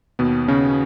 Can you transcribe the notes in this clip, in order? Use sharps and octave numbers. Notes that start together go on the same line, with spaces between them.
D#2 B2 B3
C#3 C#4